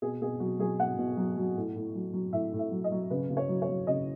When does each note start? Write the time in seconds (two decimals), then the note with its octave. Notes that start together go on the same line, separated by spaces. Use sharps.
0.02 B2 G#4
0.22 B2 G#4
0.40 F#3 F#4
0.59 F#3 G#4
0.80 B2 F#5
0.98 B2
1.17 F#3
1.37 F#3
1.57 A2
1.76 A2
1.95 F#3
2.14 F#3
2.33 A2 E5
2.53 A2
2.59 E5
2.71 F#3
2.84 D#5
2.92 F#3
3.10 C#3 B4
3.30 C#3
3.37 C#5
3.49 F#3
3.62 C#5
3.69 F#3
3.87 C#3 D#5